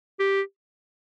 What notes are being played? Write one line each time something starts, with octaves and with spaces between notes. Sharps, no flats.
G4